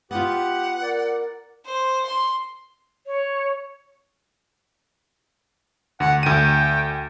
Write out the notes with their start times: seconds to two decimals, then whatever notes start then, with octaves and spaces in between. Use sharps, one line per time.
0.11 B3 F4 G4 B4 F#5
0.82 A#4 D5
1.66 C5
2.06 C6
3.07 C#5
6.00 D2 F#5
6.23 D2 G5 D#7